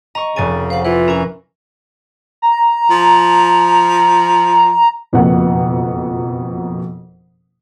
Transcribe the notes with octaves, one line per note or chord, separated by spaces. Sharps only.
D#5 A#5 C#6
F1 C#3 G#5 A6 D#7
C5 F5 F#5
E3 F4 B4
C#4 A#4 G#5
A#5
F3
F#1 F2 B2 F3 A#3 F#5